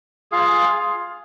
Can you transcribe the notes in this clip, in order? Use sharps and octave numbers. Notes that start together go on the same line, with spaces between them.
F4 G#4 F5